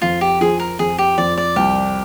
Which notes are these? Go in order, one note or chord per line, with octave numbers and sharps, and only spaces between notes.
F2 F4
G4
F3 G#4
A#4
F2 G#4
G4
F2 D5
D5
C2 G4